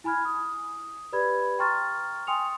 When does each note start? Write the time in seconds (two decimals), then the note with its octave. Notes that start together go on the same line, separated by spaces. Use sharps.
0.04 E4 G#5 B5 F6 G#6
0.25 D#6
1.12 G4 B4 D5 B5 G#6
1.59 G5 A#5 C6 C#6 F6 A6
2.27 G5 G#5 C6 D#6 C#7 F7